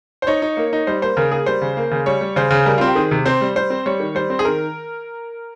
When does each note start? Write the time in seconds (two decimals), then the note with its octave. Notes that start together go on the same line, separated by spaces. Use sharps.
0.22 C5
0.27 D#4 C#5
0.42 D#4
0.57 A#3
0.73 D#4
0.87 G3 C5
1.02 A#3 C5
1.17 C#3 A#4
1.32 A#3 G#4
1.46 G3 C5
1.62 C#3
1.77 A#3
1.91 C#3
2.06 G3 C#5
2.21 G3
2.36 C#3 C5
2.51 C#3
2.66 G3 A#4
2.78 C4 F4
2.87 G4
2.95 D#3 G#4
3.11 C3
3.26 C4 C5
3.41 G3
3.56 G3 C5
3.70 C4
3.86 G3 C#5
4.00 D#3
4.15 G3 C5
4.30 C4
4.39 G#4
4.45 D#3 A#4